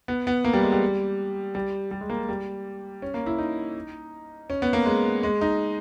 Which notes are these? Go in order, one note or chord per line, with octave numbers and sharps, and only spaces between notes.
B3
B3
A#3
G3
G#3
G3
G3
G3
G#3
A#3
G3
C#4
A#3
E4
D#4
C#4
B3
A#3
G#3
G#3
D#4